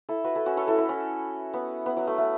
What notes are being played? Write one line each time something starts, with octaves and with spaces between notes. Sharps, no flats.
E4 A4
F#4 B4
E4 A4
C#4 F#4
A4 C#5
E4 A4
E4
C#4
B3
B3
F#3
A3
A3